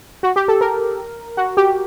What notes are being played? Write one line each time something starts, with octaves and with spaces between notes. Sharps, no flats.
F#4
G4
A4
A#4
F#4
G4